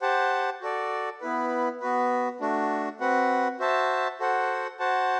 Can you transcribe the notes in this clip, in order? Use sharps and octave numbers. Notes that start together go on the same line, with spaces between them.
G4 C5 F#5 A5
F#4 A4 D5
B3 E4 B4
B3 F#4 B4
A3 D4 F#4
C4 F#4 B4 F#5
F#4 C5 E5 A5
F#4 A4 C5 F#5
F#4 C5 F#5 A5